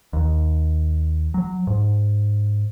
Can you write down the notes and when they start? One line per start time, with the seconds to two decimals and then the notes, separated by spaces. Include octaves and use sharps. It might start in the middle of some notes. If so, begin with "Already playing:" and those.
0.13 D#2
1.34 F#3
1.67 G#2